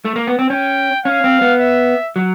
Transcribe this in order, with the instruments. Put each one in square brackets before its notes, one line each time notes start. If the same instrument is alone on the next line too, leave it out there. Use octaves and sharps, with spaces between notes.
[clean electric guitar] A3
A#3
B3
C4
[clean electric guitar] C#4 [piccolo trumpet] G5
[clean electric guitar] C#4 [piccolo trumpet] F5
[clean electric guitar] C4
B3
[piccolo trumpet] E5
[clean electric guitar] F#3